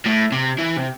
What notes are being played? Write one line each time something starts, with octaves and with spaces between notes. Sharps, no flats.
A2
C3
E3
C3